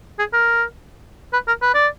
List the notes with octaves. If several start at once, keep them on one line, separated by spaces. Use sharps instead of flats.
G#4
A#4
B4
A#4
B4
D5